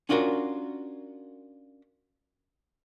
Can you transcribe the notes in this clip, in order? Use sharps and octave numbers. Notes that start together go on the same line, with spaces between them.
C#4 D4 F4 F#4 A#4